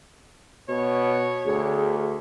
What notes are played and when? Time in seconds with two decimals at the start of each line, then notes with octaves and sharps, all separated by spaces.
0.69 B2 C#5
1.45 D2 G#4